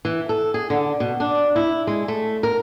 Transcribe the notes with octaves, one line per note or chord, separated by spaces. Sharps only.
E3
A4
G#4
D3
B2
D4
E4
G#3
A3
A#4